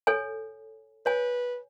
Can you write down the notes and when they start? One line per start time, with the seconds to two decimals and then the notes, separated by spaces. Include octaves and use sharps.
0.07 A4 C#5 G#5
1.06 B4 C#5 G#5